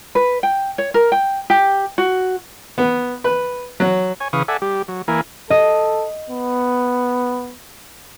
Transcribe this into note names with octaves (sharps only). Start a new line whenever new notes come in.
B4
G5
C#5
A#4
G5
G4
F#4
B3
B4
F#3
C#5 G#5
C#3 E3 B4 F5 C#6 D#6
A4 D5 E5 F#5 G#5
G3 G4
F#3
E3 A#3 E4 A#4 G#5
A4 D#5
B3